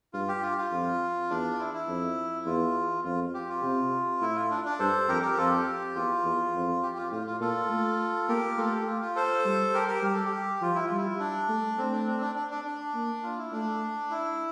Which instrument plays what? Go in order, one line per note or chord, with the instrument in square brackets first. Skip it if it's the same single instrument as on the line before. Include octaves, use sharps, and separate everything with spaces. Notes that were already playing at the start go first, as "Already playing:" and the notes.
[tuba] G2 [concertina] F4
[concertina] G4
F4
F4
[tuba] F2
[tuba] E2 [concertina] D4
[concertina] E4
E4
[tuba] F2
[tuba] E2 [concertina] F4
[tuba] F2 [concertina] F4
[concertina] G4
F4
[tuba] C3
[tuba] A2 [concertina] E4
[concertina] F4
D4
D4
[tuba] G2 [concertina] A4 C5
[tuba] F2 [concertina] G4 A#4
[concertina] G4 A#4
[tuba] F2 [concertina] F4 A4
[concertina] G4
[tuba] E2 [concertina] F4
[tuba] E2
F2
[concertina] G4
F4
[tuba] A2 [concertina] F4
[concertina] F4
[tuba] A#2 [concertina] F4 A4
[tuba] A3
[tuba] A#3 [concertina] G4 A#4
[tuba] A3 [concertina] F4 A4
[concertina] G4
F4
F4
A4 C5
[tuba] G3
[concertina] G4 A#4
G4 A#4
[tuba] G3 [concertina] G4
[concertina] A4
G4
[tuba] F3 [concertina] F4
[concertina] E4
[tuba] G3 [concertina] F4
[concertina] E4
D4
[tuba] A3
[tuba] A3 [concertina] C4
[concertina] D4
C4
D4
D4
D4
D4
[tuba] A#3
[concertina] F4
E4
[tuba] A3 [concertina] D4
[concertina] E4